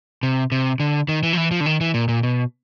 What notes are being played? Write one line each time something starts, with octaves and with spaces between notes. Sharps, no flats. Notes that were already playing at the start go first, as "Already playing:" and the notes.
C3
C3
D3
D#3
E3
F3
E3
F3
D3
D#3
E3
A#2
A#2
B2